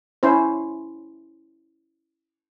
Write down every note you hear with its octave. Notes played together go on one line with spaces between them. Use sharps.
C#4 E4 C5